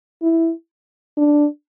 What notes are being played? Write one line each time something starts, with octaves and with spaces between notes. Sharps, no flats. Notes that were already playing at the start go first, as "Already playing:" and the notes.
E4
D4